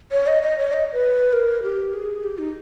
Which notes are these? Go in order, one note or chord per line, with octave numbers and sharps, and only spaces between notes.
C#5
D#5
D#5
C#5
D#5
B4
A#4
G4
G#4
G4
D#4